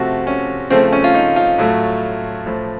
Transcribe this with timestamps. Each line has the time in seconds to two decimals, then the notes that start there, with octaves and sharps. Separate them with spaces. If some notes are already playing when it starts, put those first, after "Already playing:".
Already playing: C3 F3 A3 F#4
0.27 C#4
0.70 C#3 F3 A3 C4
0.93 C#4
1.04 F4
1.14 D#4
1.36 F4
1.58 A2 F#3 A3
2.46 A2 F3 A3